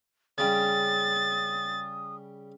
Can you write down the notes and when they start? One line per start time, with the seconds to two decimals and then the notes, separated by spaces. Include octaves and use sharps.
0.38 C#3 G3 D#6 A6